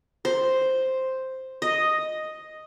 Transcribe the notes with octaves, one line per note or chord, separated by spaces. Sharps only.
C5
D#5